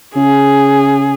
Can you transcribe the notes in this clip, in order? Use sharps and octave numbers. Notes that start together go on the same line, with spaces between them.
C#3 G#4